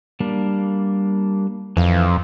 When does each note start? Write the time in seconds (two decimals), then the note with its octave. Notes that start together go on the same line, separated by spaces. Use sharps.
0.20 G3 A#3 D4
1.77 F2 E3 F5